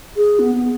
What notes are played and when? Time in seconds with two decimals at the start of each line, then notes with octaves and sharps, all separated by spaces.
0.16 G#4
0.39 B3
0.56 B3